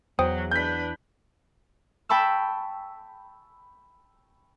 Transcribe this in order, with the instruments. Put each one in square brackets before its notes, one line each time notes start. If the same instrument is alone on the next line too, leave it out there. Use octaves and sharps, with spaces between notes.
[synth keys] E2 [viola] F#3 [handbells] C5 G5 D#6
[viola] D4 B4 [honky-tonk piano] G6 B6
[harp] G5 A5 B5 C#6 E6